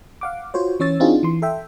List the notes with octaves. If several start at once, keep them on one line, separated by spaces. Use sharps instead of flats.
F5 F#5 D6
F4 F#4 C5 C#5
E3 C#4 C#5 E6 A6
C4 D4 D#4 F4 F#4 G#4
E3 C6
A4 E5 G5